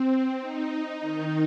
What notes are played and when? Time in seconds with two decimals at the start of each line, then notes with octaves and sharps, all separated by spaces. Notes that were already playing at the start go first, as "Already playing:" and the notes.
Already playing: C4
0.40 D#4
1.02 D#3